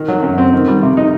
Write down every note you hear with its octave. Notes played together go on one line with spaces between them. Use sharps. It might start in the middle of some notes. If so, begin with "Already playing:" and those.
Already playing: D#3
F#3
F#2
C4
D#3
G3
C3
D#4